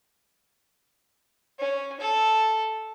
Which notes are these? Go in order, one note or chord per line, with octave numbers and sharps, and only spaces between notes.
C#4
A4